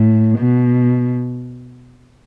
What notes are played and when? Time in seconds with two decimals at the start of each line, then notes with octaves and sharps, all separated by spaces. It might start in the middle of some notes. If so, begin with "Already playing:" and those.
Already playing: A2
0.38 B2